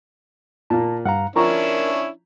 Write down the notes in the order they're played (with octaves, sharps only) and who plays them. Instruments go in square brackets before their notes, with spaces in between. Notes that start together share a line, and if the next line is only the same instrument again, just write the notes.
[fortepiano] A#2 A#3 [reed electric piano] A5
[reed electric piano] G2 F5 A#5 [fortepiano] F#5
[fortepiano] F3 A#5 C#6 [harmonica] C#4 D4 E4 [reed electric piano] A#4